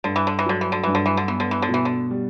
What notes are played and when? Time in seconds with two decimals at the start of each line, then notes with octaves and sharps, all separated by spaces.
0.04 G2 D3
0.16 E3
0.27 D3
0.39 E3
0.46 D3 F#3
0.61 E3
0.72 D3
0.83 G2 E3
0.95 D3
1.06 E3
1.17 D3
1.28 E3 B3
1.40 D3
1.51 E3
1.62 D3
1.69 B2
1.74 E3
1.85 D3
2.10 G3